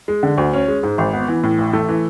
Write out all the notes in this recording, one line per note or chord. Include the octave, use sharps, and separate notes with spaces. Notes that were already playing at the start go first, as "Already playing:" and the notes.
G#3
D3
D2
C#4
G#3
G#2
G#1
B3
E3
A2
A1
A3
E3